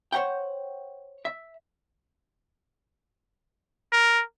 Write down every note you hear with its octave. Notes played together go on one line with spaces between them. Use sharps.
C5 C#5 E5 F#5 G5
E5
A#4